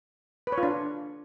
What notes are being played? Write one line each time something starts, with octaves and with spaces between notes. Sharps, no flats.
B4
C#5
F4
D4